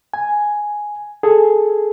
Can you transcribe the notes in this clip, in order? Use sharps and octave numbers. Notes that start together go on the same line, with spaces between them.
G#5
G#4 A4